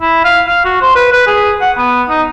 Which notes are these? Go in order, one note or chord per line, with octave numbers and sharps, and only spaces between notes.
E4
F5
F5
F#4
C5
B4
B4
G#4
F#5
B3
D#4